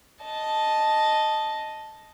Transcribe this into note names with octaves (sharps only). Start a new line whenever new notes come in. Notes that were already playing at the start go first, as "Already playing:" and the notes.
D#5 A5